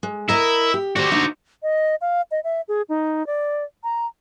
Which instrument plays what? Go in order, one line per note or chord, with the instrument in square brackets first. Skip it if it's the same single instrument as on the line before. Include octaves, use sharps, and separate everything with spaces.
[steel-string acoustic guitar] G#3
[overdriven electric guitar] E4 [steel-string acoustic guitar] A#4 D#5 A#5
[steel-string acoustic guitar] G4
[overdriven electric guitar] F#4 C5 [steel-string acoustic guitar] G4 D5
[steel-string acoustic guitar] D4 D#4
[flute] D#5
F5
D#5
E5
G#4
D#4
D5
A#5